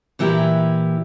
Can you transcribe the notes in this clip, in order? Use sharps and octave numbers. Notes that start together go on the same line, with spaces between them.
A#2 E3 E4 G4 A#5